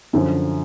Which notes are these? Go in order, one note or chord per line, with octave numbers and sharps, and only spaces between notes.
F#2 D3 F3